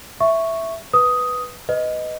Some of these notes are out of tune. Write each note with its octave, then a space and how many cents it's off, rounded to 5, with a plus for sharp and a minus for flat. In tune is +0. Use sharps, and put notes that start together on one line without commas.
E5 +0 C#6 +0
B4 +0 D#6 +10
B4 +20 D#5 +0